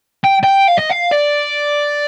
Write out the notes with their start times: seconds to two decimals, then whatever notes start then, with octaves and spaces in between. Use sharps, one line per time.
0.25 G5
0.44 G5
0.68 F5
0.79 D#5
0.91 F5
1.13 D5